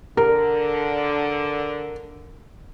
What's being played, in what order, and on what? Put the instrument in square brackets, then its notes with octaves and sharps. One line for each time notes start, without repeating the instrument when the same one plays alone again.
[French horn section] D3 [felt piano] A#4